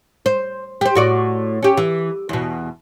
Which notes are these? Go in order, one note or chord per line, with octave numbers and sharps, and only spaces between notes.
C5
G4 C5
A2 F#4 D5
C#4 G4
E3
E2 B2